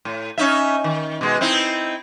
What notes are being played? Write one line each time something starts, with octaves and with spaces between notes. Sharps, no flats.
A2
C#4 D#4 E5
D#3
B2 G#3
C4 D#4 E4